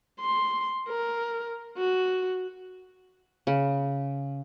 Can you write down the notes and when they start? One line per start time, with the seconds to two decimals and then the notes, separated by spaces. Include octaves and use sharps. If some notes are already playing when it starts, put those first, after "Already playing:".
0.21 C6
0.89 A#4
1.77 F#4
3.47 C#3